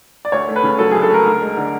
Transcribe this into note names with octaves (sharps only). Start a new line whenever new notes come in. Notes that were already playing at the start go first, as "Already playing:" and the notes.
D5
D2 C#5
A3
B4
C#3
F#3 A4
D2 G#4
A4
A3 A#4
D2
G#3
D3